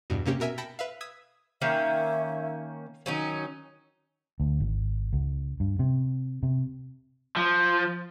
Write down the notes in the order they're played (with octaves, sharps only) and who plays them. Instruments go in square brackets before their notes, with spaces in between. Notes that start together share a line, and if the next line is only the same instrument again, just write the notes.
[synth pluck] E2 G2 B2
C3 A#3 C#4 G4
B2 A#4 E5 G#5
G5 A5 B5 A#6 C#7 D7
B4 E5 F5
D#6 E6 G#6 B6
[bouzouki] D#3 A#3 C#4 [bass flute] E5
[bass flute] D#3 [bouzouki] F#3 C#4 D#4
[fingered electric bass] D2
G#1
C#2
G2
C3
C3
[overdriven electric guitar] F3